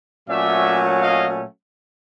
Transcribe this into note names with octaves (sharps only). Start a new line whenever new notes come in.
A#2 F#3 A3 C#4 D5 E5
D#5 F5